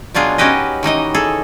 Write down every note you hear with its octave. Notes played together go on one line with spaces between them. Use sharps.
B2 F#3 D4 F4 G#4
C#4 D#4 F#4 G4 B4 D#5
D#3 E3 D#4 D#5
G#4 A4